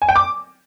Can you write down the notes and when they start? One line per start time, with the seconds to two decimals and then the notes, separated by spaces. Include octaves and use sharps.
0.02 G#5
0.09 G5
0.16 D6